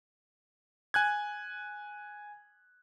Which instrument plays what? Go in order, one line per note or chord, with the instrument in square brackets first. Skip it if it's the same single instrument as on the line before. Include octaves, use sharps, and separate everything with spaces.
[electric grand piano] G#5 F#6 G#6